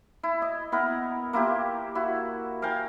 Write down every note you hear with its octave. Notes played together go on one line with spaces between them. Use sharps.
E4
D#5
B3 E4 A#4
A#3 E4 F4 G4
E4 F#4
A#4 F5 G5 G#5